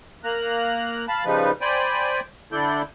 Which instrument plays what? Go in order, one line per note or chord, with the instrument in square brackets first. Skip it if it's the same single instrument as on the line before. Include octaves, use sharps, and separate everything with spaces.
[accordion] A#3 A#5 F#6
F5 A5 B5
C#3 F3 G3 D#4 B4
C5 D5 G5 G#5 B5
D3 D4 E4 A4 D5 G6